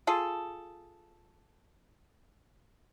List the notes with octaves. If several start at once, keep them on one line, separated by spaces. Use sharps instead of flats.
F4 G#4 A4